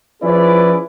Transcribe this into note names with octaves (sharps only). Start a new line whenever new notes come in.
F3 C#4 E4 G#4 B4 D5